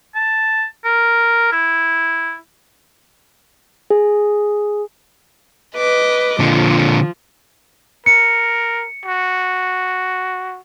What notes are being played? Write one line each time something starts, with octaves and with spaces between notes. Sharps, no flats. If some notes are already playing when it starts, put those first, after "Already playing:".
A5
A#4
E4
G#4
B4 D#5 D6
A#2 D3 F3
A#4 C#7
F#4